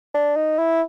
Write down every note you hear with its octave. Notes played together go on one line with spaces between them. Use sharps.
D4
D#4
E4